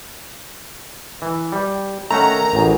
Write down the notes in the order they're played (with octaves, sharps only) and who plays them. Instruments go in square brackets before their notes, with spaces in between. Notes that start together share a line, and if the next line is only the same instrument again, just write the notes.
[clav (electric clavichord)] E3
G3
[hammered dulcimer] D#3 [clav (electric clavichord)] A3 C#4 F#5 [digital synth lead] A#5
[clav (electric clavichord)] A1 [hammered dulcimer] E4 F#4 G#4